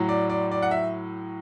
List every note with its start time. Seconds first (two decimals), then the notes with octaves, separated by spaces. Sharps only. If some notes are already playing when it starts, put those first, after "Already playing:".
Already playing: A2 F#3
0.09 D5
0.30 D5
0.51 D5
0.62 F#5
0.71 E5